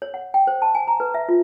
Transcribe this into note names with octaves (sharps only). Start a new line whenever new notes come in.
C#5
F#5
G5
C5
A5
G#5
A#5
B4
E5
F4